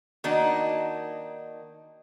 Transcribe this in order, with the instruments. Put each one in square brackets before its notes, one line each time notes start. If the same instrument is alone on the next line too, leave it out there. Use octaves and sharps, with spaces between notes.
[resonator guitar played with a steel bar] D#3 A#3 D4 D#4 F#4